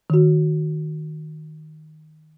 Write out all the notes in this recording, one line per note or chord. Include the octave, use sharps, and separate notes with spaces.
D#3 F#4